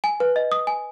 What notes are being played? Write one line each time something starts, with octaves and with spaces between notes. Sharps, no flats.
G#5
B4
D#5
D#6
G#5